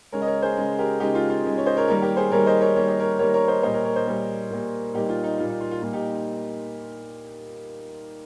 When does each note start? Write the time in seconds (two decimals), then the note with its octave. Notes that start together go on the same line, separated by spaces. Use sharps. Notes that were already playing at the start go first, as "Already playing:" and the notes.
0.12 C#3 G#3 A#4 C#5
0.22 D#5
0.27 A#4 C#5
0.42 G#4 C5
0.57 C#3 G#3
0.78 G4 A#4
1.00 C#3 G#3 D#4 G4
1.15 F4
1.30 F4
1.44 C#3 G#3
1.58 C#5
1.66 C5 D#5
1.77 A#4 C#5
1.88 D#3 G3 A#3 A#4 C#5
2.02 G4 A#4
2.17 G#4 C5
2.32 D#3 G3 A#3 A#4 C#5
2.46 C5 D#5
2.61 A#4 C#5
2.76 D#3 G3 A#3 C#5
2.88 D#5
3.00 A#4 C#5
3.19 D#3 G3 A#3 A#4 C#5
3.34 A#4 C#5
3.48 C5 D#5
3.63 A#2 G3 A#3 C5 D#5
3.74 A#4 C#5
3.84 A#4 C#5
3.96 C5 D#5
4.07 A#2 G3 A#3
4.51 A#2 G3 A#3
4.94 A#2 G3 A#3 D#4 G4
5.09 F4
5.24 D#4
5.38 A#2 G3 A#3 F4
5.49 D#4
5.61 F4
5.71 F4
5.82 A#2 G3 A#3 F4
5.93 D#4 G4